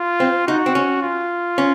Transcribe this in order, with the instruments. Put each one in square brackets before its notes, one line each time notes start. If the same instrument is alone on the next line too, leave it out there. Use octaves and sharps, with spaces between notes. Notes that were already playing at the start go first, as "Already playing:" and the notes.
Already playing: [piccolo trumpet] F4
[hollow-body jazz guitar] C4
[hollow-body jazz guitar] D#4 [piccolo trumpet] F#4
[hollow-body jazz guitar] C4
C#4
[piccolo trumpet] F4
[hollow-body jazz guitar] C#4